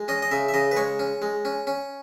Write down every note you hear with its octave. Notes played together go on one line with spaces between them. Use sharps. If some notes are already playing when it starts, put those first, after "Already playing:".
Already playing: G#3
C#4 D#5
D#5
C#3 E5
E5
C#3 D#5
B4
G#3 C#5
C#4
G#3
C#4
C#4